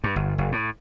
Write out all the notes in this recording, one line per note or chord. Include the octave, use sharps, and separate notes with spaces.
G2
G1
F#1
A2